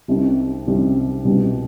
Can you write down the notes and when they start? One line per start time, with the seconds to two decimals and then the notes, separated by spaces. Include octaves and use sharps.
0.08 C2 C3 G3 C4 D#4
0.67 C2 C3 G3 C4 D#4
1.25 C2 B2 G3 B3